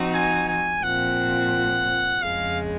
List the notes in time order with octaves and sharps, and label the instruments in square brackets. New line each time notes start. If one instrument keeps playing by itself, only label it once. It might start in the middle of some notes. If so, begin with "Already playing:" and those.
Already playing: [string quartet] F3 C4 D#4 F#4
[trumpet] G#5
G#5
[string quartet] A#2 F3 C4 [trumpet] F#5
[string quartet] F2 C#3 G#3 [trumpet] F5